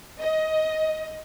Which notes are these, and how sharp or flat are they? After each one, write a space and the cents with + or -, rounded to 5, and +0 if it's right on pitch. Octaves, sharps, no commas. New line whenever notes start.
D#5 +15